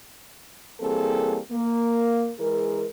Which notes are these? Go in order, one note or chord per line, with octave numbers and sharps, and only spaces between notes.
E3 G3 A#3 C4 G#4 A4
A#3
E3 G#3 G#4 A#4